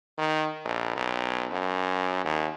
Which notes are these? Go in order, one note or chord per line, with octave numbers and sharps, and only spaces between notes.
D#3
A#1
B1
F#2
D#2